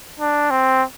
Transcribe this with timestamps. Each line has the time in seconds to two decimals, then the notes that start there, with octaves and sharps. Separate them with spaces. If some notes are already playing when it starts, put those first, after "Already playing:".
0.20 D4
0.50 C4